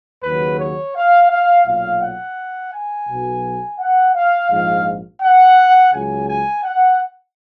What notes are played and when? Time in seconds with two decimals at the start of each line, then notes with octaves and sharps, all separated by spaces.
0.24 D#2 C#3 F#3 B4
0.60 C#5
0.96 F5
1.31 F5
1.67 B1 A#2 F#3 F5
2.02 F#5
2.73 G#5
3.09 B1 B2 F#3
3.79 F#5
4.15 F5
4.51 A#1 G#2 F3 F5
5.22 F#5
5.93 C#2 C#3 F#3 G#5
6.29 G#5
6.64 F#5